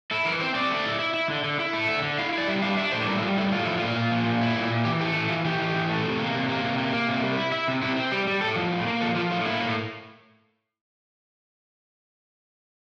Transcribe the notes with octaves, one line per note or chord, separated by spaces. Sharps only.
E4 A4
E3 A#4
C4 C5
C4 D5
A3
E4
E4
E4
D3
D3
E4
A3
D3 E5
D3
E4 F5
E4 D5
G3 E5
D4 F5
D4 E5
A2 C5
G3 A#4
E4
G3 F4
A2 E4
A2 F4
F3 E4
A#2 F4
A#2
F3
A#2
E4
A#2
A#2
E3 G4
A3 G4
E3
E3 F4
E3 G4
E3
E3
A3
C3
A#3
C3
A#3
C3
A#3
A#3
C3
G3
E4
E4
C3
C3 E4
C4
G3 G4
G3
A2 A4
F3
A2
A#3
F3 A4
F3 F4
A2 F4
A#3 E4
A2